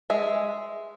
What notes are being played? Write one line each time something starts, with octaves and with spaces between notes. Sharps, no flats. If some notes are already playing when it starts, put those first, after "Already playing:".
G#3 E5